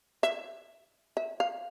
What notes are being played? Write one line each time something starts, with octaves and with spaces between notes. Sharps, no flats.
E5
E5
F5